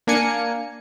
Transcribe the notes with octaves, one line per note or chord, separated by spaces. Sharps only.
A#3 D4 G#5 C#7